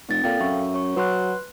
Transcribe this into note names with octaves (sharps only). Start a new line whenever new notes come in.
F1 C4 A6
A#2 A4 F5 G5
F#2 E5 C#6
C#5 C#6
F#3 B4 C6 F#6